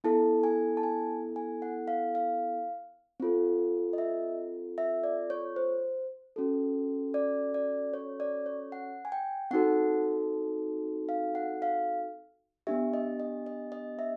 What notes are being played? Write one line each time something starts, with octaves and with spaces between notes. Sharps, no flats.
B3 E4 A4 A5
G#5
A5
G#5
G#5
F#5
F5
F5
C4 F4 A4
D#5
E5
E5
D5
C#5
C5
C#4 F#4 A4
D5
D5
C#5
D5
C#5
F#5
G#5
G5
C4 D#4 F#4 A4 F#5
F5
F#5
F5
B3 D4 G4 E5
D#5
D#5
D#5
D#5
E5